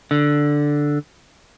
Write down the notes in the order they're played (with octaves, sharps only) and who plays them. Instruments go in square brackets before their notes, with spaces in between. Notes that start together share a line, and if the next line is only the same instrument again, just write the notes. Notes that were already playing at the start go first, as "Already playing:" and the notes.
[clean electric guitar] D3